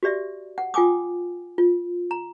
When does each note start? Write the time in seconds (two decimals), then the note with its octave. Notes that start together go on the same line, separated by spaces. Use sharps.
0.03 F#4 G4 D5 E5
0.58 F#5
0.74 F4 G5 G#5 D6 D#6
1.58 F4
2.11 A#5